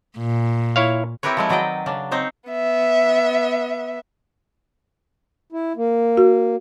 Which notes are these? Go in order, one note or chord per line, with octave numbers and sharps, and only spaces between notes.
A#2
E4 C#5 F5
C4 E4 G4 A#4 B4 C#5
F3 G#3 E4
D#3 F#3 D5 D#5 G5
C#3 C#4 D4
C4 D#4 C5 C#5
B3 E5
E4
A#3
F#4